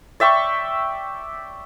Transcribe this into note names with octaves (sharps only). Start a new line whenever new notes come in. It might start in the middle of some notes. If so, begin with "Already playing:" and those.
D5 E5 G5 C#6